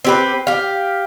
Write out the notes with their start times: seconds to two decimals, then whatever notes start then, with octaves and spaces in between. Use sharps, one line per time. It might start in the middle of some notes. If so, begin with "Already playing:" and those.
0.05 C4 G4 B4
0.47 G4 F5